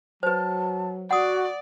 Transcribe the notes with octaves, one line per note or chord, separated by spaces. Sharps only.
F#3 B4 C5 A5
F#4 D5 F#5 D#6